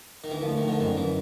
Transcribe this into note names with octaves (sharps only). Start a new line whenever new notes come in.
D#3
D3 E3
F3
A3
D#3
D3 F3
F#2 D#3
D3 E3